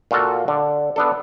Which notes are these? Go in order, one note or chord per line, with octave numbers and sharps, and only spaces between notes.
A#2 F4 F#4 A4
D3
B3 D4 A4